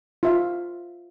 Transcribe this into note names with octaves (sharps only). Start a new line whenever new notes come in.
F4 E5